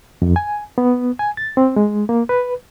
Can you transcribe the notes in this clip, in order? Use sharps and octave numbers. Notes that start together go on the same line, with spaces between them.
F2
G#5
B3
G#5
A6
C4
G#3
A#3
B4